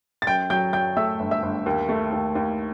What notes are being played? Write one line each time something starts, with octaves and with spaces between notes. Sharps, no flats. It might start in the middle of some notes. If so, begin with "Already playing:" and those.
A6
F#2 G5 G6
F#3 G5 G6
F#3 G5 G6
A3 E5 E6
G1
E5 E6
G1
D#2
A3
D#2
D#2